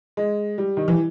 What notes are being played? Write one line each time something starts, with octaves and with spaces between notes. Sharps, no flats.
G#3
G3
D#3
E3